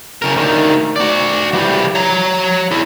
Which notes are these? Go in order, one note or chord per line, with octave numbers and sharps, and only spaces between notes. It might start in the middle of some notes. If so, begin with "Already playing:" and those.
C#3 A#4
D2 D#3
F#4 D5
E3 G3
C#5 A#5
E4 G#4